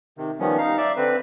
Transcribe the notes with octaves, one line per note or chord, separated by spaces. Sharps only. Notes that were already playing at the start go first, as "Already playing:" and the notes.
C3 D#3
D#3 F3 G3 B3 C#4
D#4 F5
D5 E5
D3 C4 B4